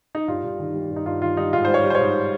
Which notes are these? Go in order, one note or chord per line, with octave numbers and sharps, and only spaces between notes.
D#4
G2 F4
G2
D#3
G3
G2
D#4
G2 F4
D#3 F4
G3 D#4
G#2 F4
G3 C5
C#5
G3
C5
G#2 C#5